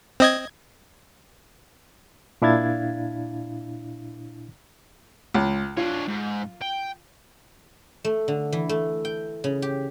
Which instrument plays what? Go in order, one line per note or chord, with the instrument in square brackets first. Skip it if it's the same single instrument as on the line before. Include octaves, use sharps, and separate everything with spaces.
[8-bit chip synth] C4 D#5 G#6
[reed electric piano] A#2 D4 E4 F5 G#6 A6
[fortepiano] C#2
[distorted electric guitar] D4 C#5 [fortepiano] F4
[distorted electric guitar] G#2
G5
[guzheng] A3
D3
E3
A3
G5
C#3
G4